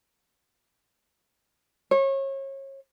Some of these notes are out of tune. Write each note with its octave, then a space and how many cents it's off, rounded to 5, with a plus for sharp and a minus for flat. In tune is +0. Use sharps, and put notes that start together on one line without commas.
C#5 -30